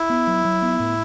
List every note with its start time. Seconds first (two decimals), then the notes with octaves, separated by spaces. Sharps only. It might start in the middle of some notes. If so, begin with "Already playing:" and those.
Already playing: E4
0.10 B3
0.27 F#3
0.45 F#3
0.62 B3
0.80 A2